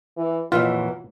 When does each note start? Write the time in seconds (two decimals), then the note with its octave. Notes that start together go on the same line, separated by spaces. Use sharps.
0.17 E3
0.52 F2 A#2 E3 F#3 F4